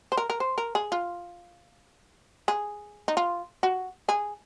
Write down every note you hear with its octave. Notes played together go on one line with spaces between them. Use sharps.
C5
A#4
A#4
C5
A#4
G#4
F4
G#4
D#4
F4
F#4
G#4